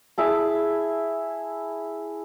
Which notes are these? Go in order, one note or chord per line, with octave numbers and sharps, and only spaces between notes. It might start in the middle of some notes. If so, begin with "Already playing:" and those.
E4 G#4 E5 A5